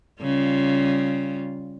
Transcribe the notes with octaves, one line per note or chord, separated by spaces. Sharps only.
C#3 G3 F4